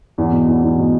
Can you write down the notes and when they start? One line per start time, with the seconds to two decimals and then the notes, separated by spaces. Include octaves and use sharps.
0.18 E2
0.32 B2
0.48 E2
0.63 E2
0.78 B2